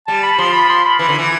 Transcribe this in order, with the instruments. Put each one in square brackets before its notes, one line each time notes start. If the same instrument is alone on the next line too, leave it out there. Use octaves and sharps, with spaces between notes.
[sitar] G3 [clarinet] A5
[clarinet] B5
[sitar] F3 [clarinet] C6
[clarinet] B5
C6
B5
[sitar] E3 [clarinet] B5
[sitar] D3
E3